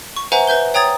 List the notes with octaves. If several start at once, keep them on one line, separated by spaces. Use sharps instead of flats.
C#6
B4 C5 E5 F#5 G#5 A#5
B4 E5 G6 G7
C#5 G5 A#5 D#6 G#6 A6